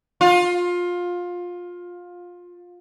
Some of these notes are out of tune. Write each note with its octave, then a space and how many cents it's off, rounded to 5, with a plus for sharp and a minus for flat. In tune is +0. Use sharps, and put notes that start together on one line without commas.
F4 +20